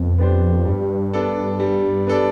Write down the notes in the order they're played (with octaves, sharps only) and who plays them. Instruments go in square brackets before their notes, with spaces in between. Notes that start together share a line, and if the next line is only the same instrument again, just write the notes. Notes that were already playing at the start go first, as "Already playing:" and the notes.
Already playing: [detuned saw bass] F2 [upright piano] B2 B3
[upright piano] B3 D4 G4 C5
[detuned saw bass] G2 [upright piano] G3
[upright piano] B3 D4 A4 D5
G3
B3 D4 A4 D5